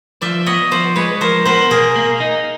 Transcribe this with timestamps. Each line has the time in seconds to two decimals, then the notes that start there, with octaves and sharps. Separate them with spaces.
0.22 F3 D5 E5
0.46 B3 C#5 D#5
0.71 F3 C5 D5
0.96 G#3 B4 C#5
1.21 F3 A#4 C5
1.45 B3 A#4 C5
1.71 B2 G#4 A#4
1.96 A#3
2.20 D#4